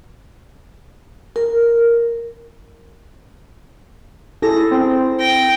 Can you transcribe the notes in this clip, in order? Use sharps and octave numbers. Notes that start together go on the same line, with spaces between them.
A#4
E4 G#4 A4 A#6
C4
G5 A#6